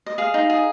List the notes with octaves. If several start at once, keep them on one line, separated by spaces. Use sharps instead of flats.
D#5
G#4 F5
D#4
G#4